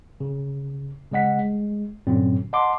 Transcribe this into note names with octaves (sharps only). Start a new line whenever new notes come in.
C#3
C#3 G#3 D#5 F#5 B6
G#3
G2 A#2 D3 F#3 C4 C#4
D#5 F#5 A5 C6 D6